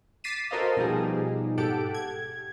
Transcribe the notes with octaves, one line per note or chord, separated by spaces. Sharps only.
D6 A6 B6 C7 D#7 E7
F#4 A4 A#4 C5 D#5 F5
B2 F3 G3 D#4 G4 G#4
G#2 G4 A4 F#5 D7
G#6